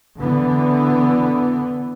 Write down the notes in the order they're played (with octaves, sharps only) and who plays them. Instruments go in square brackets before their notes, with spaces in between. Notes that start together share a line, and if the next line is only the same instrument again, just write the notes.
[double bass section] D3 E3 B3